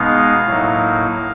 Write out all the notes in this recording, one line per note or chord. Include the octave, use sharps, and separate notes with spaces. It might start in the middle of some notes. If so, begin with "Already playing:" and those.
Already playing: B2 G#3 B3 D#4 F5
A2 F#3 A#3 D#4